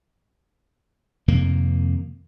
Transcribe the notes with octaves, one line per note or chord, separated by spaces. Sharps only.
F2 C3 D#3 A#3